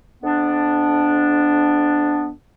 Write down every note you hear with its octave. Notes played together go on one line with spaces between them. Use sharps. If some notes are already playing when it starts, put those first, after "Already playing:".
F2 B3 D4